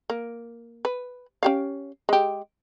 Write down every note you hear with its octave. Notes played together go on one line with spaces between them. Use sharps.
A#3
B4
C#4 G4 F5
G#3 G4